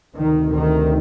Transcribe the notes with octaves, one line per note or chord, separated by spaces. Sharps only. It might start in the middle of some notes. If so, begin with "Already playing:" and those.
D2 C3 D#3
D#3